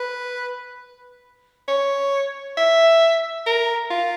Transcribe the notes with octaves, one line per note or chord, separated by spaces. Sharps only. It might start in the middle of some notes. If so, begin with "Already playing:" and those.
Already playing: B4
C#5
E5
A#4
F4